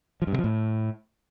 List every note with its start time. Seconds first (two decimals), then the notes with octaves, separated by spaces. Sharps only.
0.22 F3
0.27 G2
0.33 C3
0.38 F3
0.44 A2